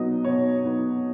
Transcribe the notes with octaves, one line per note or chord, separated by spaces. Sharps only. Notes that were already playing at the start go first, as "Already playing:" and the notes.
Already playing: B2 F#3 B3 D#4 D#5
B2 C#5
F#3 B3 D#4